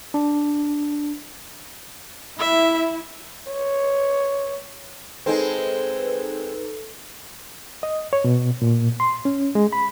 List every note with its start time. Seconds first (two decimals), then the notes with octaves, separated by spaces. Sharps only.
0.14 D4
2.39 E4 E5
3.47 C#5
5.26 G#3 C4 D#4 A4 B4
7.83 D#5
8.13 C#5
8.24 B2
8.62 A#2
9.00 C6
9.25 C#4
9.55 G#3
9.73 B5